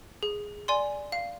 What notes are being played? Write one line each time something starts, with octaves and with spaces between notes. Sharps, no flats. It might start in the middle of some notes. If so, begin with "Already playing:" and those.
G#4
D5 G#5 C6
F5